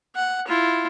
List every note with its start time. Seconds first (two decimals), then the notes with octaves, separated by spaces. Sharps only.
0.15 F#5
0.47 E4 F4